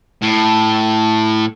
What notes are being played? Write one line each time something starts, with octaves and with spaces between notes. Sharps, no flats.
A2